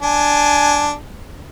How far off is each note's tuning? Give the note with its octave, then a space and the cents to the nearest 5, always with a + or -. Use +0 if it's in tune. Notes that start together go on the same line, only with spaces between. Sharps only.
D4 +0 G#5 +15